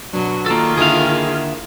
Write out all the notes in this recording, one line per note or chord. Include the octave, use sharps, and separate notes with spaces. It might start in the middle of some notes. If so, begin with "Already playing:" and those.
B2 F#3 B3 D4
D#3 A#3 F4 A4
D3 A#3 E4 G#4 F5